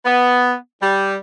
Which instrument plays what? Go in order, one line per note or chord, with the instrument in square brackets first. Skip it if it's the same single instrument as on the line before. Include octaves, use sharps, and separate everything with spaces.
[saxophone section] B3
G3